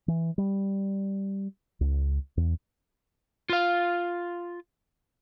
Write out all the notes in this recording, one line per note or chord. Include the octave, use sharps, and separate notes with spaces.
E3
G3
C#2
E2
F4 F5